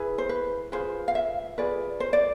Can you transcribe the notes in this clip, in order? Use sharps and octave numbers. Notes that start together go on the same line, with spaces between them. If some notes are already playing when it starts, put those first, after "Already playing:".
Already playing: E4 G#4 B4
C5
B4
F4 G#4 B4 C5
F5
E5
F4 G#4 B4 D5
C5
D5